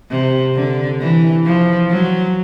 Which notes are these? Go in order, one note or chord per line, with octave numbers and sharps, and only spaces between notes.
C3
D3
E3
F3
F#3